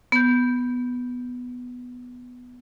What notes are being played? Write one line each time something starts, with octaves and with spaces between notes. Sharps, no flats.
B3 G6